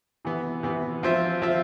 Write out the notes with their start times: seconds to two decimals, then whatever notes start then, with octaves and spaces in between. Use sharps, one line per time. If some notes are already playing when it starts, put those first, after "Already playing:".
0.25 C3 E3 B3
0.63 C3 E3 B3
1.03 F3 C4 F4 C5 E5
1.42 F3 C4 F4 C5 E5